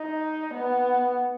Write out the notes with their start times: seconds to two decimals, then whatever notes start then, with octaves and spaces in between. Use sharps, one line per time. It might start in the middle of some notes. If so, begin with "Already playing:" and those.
Already playing: D#4
0.54 B3